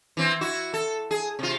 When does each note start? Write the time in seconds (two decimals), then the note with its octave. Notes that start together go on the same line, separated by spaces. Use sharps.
0.17 E3 C4
0.41 E4 F#4
0.74 A4
1.11 G#4
1.39 C3 F4